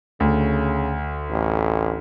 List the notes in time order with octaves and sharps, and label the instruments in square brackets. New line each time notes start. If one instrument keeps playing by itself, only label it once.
[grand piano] D2 [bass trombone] C#3
[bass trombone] A1